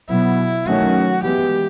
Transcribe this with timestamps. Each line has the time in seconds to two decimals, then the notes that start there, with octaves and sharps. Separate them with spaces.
0.09 B2 F#3 B3 E4
0.66 D#3 F#3 A3 C#4 F#4
1.23 E3 G#3 B3 G4